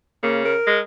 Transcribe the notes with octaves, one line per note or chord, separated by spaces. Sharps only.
C#3 A#3
A#4
G#3